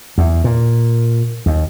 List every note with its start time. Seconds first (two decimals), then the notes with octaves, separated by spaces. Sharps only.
0.18 E2
0.44 A#2
1.46 D#2